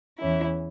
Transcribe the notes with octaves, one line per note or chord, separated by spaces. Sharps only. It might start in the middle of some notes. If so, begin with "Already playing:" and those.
E2 E3 C#4 E4